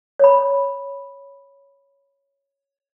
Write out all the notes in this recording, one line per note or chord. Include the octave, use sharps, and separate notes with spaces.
C#5 B5